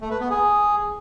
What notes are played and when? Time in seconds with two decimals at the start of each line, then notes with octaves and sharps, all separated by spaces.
0.01 A3
0.11 B4
0.20 B3
0.30 G#4